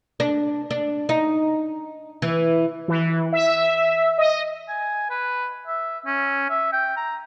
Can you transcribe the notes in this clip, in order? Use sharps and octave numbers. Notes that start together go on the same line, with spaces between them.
D4
D4
D#4
E3
E3
E5
D#5
G#5
B4
E5
C#4
E5
G5
A#5